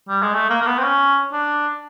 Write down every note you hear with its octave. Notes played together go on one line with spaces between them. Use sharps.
G3
G#3
A3
A#3
A#3
B3
C4
C#4
D4